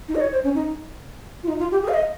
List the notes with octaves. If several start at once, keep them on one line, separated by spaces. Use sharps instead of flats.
D#4
D#5
C#5
C5
C#4
D#4
F4
D#4
F4
G4
G#4
F5
D#5